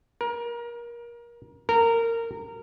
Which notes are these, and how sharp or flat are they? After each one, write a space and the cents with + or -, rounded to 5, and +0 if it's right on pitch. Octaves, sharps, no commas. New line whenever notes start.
A#4 +25
A#4 -20